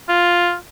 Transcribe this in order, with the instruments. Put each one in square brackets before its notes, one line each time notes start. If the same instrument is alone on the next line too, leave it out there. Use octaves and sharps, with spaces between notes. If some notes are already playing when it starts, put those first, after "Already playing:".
[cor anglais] F4